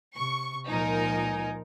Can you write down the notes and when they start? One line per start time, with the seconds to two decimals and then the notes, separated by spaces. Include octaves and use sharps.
0.17 C3 C#6
0.68 C#2 A#2 F3 D#4 A#4 G#5